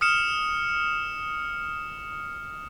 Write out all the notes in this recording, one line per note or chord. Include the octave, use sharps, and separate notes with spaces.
D#6 F6 C#7 E7